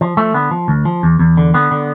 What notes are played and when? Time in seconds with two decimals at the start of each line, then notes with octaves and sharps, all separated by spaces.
0.01 F3
0.17 F3 A3
0.34 D3 B3
0.51 F3
0.68 D2
0.85 F3
1.03 E2
1.19 E2
1.37 D3
1.54 D3 B3
1.71 D3